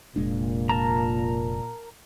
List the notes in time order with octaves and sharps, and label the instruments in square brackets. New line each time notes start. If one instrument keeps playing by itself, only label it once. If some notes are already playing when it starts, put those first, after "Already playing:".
[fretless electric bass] F1 G#3 D4 [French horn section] A#2
[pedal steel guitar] A#4 A5 A#5